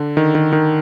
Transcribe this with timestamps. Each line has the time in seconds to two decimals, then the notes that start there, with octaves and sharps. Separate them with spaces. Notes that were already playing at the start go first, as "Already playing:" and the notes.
Already playing: D3
0.17 D#3
0.35 D#3
0.52 D#3